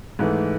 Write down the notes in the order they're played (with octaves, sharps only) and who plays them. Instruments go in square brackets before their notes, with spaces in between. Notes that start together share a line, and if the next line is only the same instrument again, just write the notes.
[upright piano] G#2 E3 A3